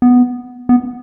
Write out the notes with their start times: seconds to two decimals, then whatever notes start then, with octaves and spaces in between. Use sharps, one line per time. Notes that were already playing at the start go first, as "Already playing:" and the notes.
0.02 B3
0.69 B3